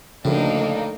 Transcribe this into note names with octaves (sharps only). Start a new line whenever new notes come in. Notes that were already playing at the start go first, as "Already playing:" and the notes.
D2 A2 C#3 F3 A#3 D4 D#4